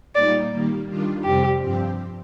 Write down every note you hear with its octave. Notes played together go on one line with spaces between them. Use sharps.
A#2 G3 A#3 D#4 D5
D#3 G3 A#3
D#3 G3 D4 F4
F2 C3 G3 C4 G4
G2 F3 C4 G4